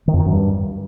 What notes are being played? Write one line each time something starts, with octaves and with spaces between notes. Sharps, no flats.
D#3
F2
D#3
F#2
G2